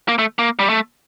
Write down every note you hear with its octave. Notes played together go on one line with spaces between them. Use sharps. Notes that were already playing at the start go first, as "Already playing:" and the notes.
A#3
A3
A#3
G3
A3